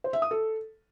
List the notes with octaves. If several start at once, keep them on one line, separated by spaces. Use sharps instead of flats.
C5
E5
D#6
A4